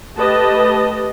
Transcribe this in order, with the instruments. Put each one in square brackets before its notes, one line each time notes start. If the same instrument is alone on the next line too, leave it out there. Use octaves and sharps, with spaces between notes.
[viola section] A3 G4 B4 D#5 A5